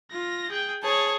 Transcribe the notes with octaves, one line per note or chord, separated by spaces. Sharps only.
F4 A#6
G#4 G5
G#4 C#5 A5